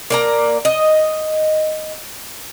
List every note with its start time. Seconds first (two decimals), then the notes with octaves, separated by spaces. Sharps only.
0.10 A#3 D5 A#5
0.65 D#5